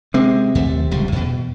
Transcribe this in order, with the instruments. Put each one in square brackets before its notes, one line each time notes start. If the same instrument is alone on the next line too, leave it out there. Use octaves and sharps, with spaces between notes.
[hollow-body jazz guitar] C3 [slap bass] G#3
[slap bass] D#2 A3
D1 C#2 G3
E2 B2